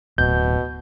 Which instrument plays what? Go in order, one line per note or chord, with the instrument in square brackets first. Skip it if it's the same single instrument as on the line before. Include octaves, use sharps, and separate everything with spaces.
[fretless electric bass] D1 [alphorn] B2 [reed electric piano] G6